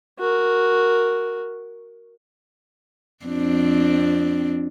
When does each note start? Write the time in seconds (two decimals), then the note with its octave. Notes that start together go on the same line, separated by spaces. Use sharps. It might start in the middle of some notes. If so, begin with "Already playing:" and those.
0.20 F#4 A#4
3.25 F2 C4 D4